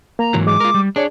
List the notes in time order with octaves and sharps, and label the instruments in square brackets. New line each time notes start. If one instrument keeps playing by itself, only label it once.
[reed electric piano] A#3 [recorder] A#5
[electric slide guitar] G#2 E3 F#3
[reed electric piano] G#3 [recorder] D6
[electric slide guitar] F4 A#4
G3
[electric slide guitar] D4 [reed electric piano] G#4 D5 [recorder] C#5